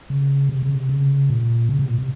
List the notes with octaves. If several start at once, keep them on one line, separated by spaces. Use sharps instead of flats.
C#3
C3
C#3
C3
C#3
A#2
C#3
C3
A#2
C3